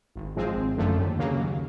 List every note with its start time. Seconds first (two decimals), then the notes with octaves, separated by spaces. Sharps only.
0.16 G#1
0.36 G#2 F3 G#3 C4
0.56 G#1
0.77 F#2 D3 F3 A3
0.98 D#2
1.19 C#3 F#3 A#3
1.40 D#2